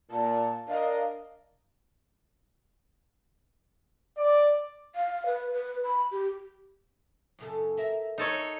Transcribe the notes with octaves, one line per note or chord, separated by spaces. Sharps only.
A#2 A5
D4 A#4 D#5 F5
D5
F5
B4
B4
B5
G4
F#2 C#3 A4
A#4 E5
D#4 A4 C#5